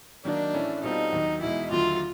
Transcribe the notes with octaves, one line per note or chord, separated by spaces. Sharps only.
D#3 F#3 A#3 D4 D#4
A2 E3 A3 C#4
B2 G3 C4 D#4 F4 A4
D#2 D#3 F#3
E2 B2 G#3 E4
D#2 D3 F#3 A3 F4